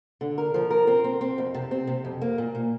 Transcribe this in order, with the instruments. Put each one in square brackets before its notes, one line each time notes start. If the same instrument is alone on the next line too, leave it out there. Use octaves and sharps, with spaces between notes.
[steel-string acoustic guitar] D3
A#4
F3
A#4
C4
C4
C4
F2
C3
C4
C3
F2
A#3
A#2
A#2